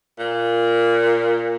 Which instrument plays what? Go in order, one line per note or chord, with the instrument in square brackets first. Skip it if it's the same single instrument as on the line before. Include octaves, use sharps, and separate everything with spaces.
[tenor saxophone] A#2